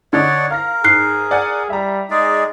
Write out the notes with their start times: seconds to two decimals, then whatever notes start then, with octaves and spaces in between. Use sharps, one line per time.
0.13 D3 D4 D#4 C#5 D5 F#5
0.51 A#4 F5 F6 A#6
0.84 G#2 G#4 F#6 C7
1.31 D5 F#5 G#5
1.70 G3 E5 A#5
2.11 G#3 D#4 G#4 D5